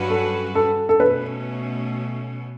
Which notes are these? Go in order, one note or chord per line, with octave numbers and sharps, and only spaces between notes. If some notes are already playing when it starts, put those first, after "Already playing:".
Already playing: G2 F#3 C#4 F#4 B4
A4
A4
A4
B2 A3 C#4 B4